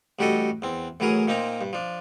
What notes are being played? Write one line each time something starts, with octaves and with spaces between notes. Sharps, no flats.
A1 G3 F#4 G4 A4 D#5
E2 C4
A2 E3 F#3 G#4 A#4 D#6
A#2 A#3 C4 D#4 A#5
G2
F3 D4